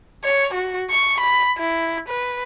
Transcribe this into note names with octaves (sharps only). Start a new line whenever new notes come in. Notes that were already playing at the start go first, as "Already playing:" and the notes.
C#5
F#4
C#6
B5
E4
B4